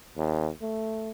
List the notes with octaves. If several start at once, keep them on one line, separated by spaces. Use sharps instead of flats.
D#2
A3